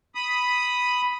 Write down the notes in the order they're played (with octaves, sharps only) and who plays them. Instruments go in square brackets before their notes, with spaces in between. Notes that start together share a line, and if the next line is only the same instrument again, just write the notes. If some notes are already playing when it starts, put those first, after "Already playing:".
[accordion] B5 D#6